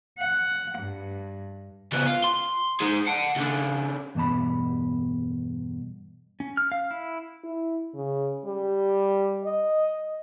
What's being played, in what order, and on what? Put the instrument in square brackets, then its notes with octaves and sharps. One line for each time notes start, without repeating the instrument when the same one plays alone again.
[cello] F#5
G2
[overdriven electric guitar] C#3 B3
F4
C6
D#4 G#4
F#5 A5
C#3 D4
[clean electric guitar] E2 G2 B2 A5 B5
[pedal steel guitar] C#4
F6
F5
E4
[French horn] E4
C#3
G3
D#5